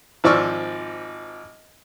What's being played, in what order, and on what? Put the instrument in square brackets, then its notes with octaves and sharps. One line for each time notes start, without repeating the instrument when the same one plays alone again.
[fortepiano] G#1 F3 D5 C#6 E6 F6